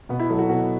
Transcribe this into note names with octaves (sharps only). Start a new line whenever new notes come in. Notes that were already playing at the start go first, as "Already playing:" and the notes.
B2 B3
E4
F#3 A4
F#4
B2 F#4